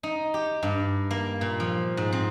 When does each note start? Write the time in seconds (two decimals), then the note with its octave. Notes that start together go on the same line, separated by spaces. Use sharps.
0.03 D#4
0.34 G4
0.63 G2
1.11 A#3
1.41 A#2
1.60 F3
1.97 G#2
2.12 C4